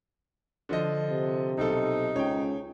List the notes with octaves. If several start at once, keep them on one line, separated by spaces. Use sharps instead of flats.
D3 F3 D#5
C3
B1 D#4 A4
C#2 C#5 G5